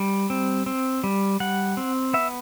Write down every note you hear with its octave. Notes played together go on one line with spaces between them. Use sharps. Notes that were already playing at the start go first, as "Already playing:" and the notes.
Already playing: G3
C4
C4
G3
G3 F#5
C4
B3 E5